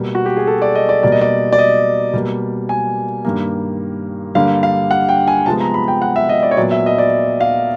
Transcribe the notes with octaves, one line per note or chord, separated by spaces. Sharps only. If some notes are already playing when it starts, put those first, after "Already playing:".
Already playing: B2 G3 A#3
F#4
G4
G#4
A4
D5
D#5
D5
B2 G3 A#3 D5
D#5
D5
D5
D#5
B2 G3 A#3
G#5
G2 D#3 G3 A#3
G2 D3 G3 A#3 F5
F5
F#5
G5
G#5
C3 F3 G#3 B3 A5
A#5
B5
G5
F#5
E5
D#5
D5
C#5
A#2 F#3 B3 D5
E5
D#5
D5
F5